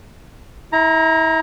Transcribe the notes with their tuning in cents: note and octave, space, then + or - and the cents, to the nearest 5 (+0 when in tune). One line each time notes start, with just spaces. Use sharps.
E4 -30 A#5 +10